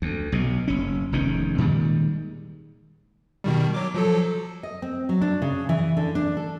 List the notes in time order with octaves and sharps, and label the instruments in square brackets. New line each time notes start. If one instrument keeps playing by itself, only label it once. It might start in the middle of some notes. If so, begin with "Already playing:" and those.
[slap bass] D2
B1 B2
F#1 C#4
F1 E2 D#3 C#4
A#2 D#3 G3 G#3
[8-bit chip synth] B2 D#3 G3
F#3 D6
F3 F#3 A4
[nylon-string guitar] D#5
C4
F#3
D4
C#3
E3
D3
D4
A4